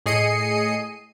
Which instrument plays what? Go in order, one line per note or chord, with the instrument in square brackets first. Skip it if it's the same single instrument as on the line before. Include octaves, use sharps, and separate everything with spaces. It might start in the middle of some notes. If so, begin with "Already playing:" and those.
[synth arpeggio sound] A2 G#4 D#5 C7 C#7 D#7